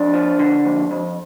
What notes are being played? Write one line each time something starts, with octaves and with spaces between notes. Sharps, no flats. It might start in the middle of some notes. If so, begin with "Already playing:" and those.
Already playing: F2 D4
F3
D3
F2
F2